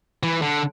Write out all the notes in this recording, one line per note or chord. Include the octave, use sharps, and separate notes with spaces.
E3
D3